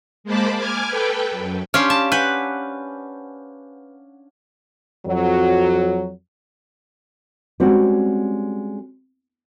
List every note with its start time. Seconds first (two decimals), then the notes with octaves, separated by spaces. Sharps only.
0.24 G#3 A#3 C5 A5 B5 D6
0.57 G#5 D6 F6 G#6
0.87 A4 B4 G5
1.31 F#2
1.74 C#4 D4 G4 C5 F5
1.90 A5
2.12 B4 F#5 G#5 G6
5.06 F2 F#3
7.60 G3 G#3 C4 C#4 F#4